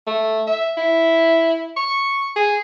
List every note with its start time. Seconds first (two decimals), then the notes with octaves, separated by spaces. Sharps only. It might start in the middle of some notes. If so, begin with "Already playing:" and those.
0.07 A3
0.47 E5
0.77 E4
1.77 C#6
2.36 G#4